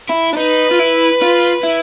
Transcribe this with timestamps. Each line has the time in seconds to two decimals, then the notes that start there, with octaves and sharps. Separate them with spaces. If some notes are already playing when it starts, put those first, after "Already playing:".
0.09 E4
0.33 D4
0.37 D#4 B4
0.71 F4
0.79 E4
1.22 F4
1.63 E4